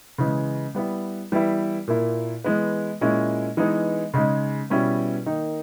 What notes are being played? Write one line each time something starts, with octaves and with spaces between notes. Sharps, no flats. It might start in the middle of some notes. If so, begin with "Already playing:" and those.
C#3 E3 G#3
G3 B3 E4
E3 G3 B3 E4
A#2 A#3 E4
E3 G#3 B3
A#2 G#3 C#4 E4
E3 G#3 B3 D#4
C#3 G#3 D#4
B2 G3 C#4 E4
D#3 A#3 D#4